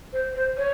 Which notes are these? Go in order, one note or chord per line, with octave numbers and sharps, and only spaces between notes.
C5
C5
C#5